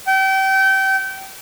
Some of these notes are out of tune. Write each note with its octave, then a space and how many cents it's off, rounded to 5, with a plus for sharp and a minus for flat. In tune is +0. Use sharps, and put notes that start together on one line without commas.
G5 -30